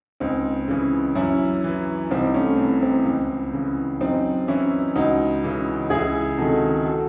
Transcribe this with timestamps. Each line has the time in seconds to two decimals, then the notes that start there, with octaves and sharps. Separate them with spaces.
0.20 C#2 C4 D#4
0.68 C#3 E3
1.15 F#2 C#4 E4
1.64 E3
2.11 C2 C4 D#4
2.34 A3 C#4
2.58 C3 E3 C4
2.82 C4
3.05 C#2
3.53 C#3 E3
4.01 F#2 C4 D#4
4.48 E3 C#4 E4
4.95 C#2 D#4 F#4
5.44 C#3 E3
5.90 C#2 E4 G#4
6.38 C3 D#3 F#4 A4
6.85 F#4 A4